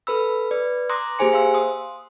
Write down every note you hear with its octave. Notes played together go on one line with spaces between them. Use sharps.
A4 B4 B5 E6
B4 D5
A#5 C6 D6 D#6 F#6 A#6
A#3 G4 G#4 C5 G#5 C#7
C5 F5 C6 E6
C6 D#6